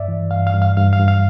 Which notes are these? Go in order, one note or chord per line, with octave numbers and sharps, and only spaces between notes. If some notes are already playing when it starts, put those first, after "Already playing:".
Already playing: G2 D5 E5
E3
G2 F5
F5
G2
F5
G2 F5
F5
G2
F5